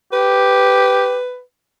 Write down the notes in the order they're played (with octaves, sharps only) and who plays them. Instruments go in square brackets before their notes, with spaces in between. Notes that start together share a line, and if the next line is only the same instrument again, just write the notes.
[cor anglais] G4 [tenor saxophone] B4